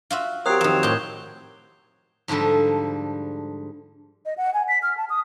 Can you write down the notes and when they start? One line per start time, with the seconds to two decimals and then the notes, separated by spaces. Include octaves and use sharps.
0.10 F4 F#4 E5
0.46 F#3 C4 G4 A#4 C#5 D#6 F#6 C7
0.61 F2 D#3 E7
0.83 A2 G4 G6 G7
2.28 G#2 D3 F3 G3 A4
4.26 D#5
4.37 F#5
4.54 G#5
4.68 B6
4.82 F6
4.97 A5
5.10 D#6